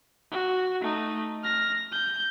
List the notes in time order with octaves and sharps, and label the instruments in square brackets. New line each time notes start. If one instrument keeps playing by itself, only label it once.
[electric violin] F#4
A3 D#4
F6 A#6
G6